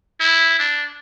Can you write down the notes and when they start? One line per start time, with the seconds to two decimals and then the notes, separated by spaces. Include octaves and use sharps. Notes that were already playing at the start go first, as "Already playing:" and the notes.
0.20 E4
0.59 D4